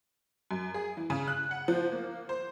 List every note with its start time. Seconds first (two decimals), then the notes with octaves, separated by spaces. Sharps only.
0.51 F#2
0.74 G#4
0.97 E3
1.10 C#3
1.28 F#6
1.51 F#5
1.68 F3
1.92 A#3
2.29 C5